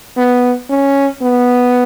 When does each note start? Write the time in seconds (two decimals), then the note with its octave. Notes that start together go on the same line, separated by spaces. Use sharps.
0.17 B3
0.70 C#4
1.22 B3